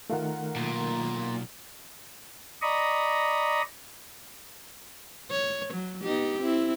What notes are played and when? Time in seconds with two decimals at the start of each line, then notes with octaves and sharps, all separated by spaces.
0.10 D#3 A3 F4 A#4 F#5
0.56 B1 A#2
2.62 D5 D#5 A#5 B5 C#6 D#6
5.31 C#5
5.74 F#3
6.02 B3 D#4 G4
6.40 C4 E4